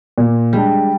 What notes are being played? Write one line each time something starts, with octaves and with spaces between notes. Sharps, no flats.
A#2
G3 G#3 D4